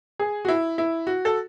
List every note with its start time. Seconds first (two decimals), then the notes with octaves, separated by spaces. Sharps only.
0.19 G#4
0.45 F#4
0.48 E4
0.78 E4
1.07 F#4
1.25 A4